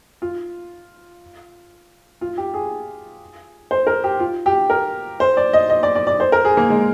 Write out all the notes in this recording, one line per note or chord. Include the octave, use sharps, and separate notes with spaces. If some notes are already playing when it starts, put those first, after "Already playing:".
F4
F4
G4
G#4
C5
A#4
G4
F4
G4
A#4
C5
D5
D#5
D#5
D5
D5
D5
C5
A#4
G#4
A#3
G#3